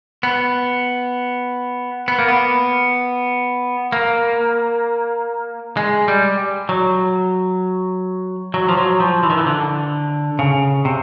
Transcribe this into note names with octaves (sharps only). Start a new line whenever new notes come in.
B3
B3
A#3
B3
A#3
G#3
G3
F#3
F#3
F3
F#3
F3
E3
D#3
E3
D3
C#3
C3